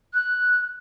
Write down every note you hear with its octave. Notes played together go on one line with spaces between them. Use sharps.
F#6